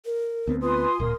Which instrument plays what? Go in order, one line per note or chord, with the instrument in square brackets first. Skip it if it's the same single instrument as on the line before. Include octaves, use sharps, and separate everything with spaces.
[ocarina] A#4
[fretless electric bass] D2 B3 C4
[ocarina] F4 [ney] B4 [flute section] G#5 C6 D#6
[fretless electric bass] D1 A#2 [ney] A#4